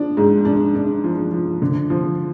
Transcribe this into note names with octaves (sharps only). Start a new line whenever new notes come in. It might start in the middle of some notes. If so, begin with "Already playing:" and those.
Already playing: F3 D4
G#2
D4
D4
F3
F3
D3
F3